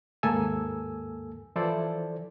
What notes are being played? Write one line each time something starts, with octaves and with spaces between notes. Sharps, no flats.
D#2 G#2 A#3 A4 G#5 E6
E3 F3 E4 A4 C5 D5